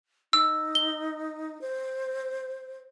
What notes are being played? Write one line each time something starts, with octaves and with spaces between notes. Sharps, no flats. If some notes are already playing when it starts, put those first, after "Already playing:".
D#4 E6
G7
C5